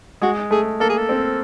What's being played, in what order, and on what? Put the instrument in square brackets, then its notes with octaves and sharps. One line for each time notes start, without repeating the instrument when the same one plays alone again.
[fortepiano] G#3 [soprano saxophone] F#4
[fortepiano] A3 [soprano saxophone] G#4
[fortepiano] A#3 [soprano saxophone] A4
[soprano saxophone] G#4
A4
[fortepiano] C4